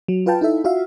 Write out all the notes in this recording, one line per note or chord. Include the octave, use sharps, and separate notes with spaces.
F#3
F4 B4 F5 G5 A5
D#4 E4 A4 E5
F4 F#4 E5 F5